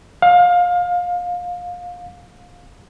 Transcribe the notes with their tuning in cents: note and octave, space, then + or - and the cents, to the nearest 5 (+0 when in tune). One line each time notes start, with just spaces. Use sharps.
F5 +25